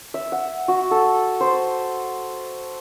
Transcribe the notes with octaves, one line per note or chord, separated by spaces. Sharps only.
E5
F#5
F#4
A4
C5